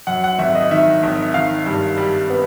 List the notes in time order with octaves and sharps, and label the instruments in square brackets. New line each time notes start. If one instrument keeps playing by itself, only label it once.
[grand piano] F#2 F#5
F#5
G#1 E5
D#5
D#3 E5
G#1
D#3 F5
G2
G3
B3